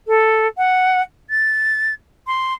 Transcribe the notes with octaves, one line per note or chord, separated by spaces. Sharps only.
A4
F#5
A6
C6